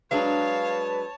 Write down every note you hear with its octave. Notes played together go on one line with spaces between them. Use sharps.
F#3 G#3 D4 B4 C#5 F5 A5